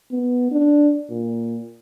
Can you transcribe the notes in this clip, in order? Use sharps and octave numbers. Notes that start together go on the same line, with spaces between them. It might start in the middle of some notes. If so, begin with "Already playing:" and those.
B3
D4
A#2